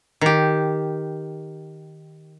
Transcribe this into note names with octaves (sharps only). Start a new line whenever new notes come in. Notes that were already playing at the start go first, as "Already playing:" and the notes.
D#3 G4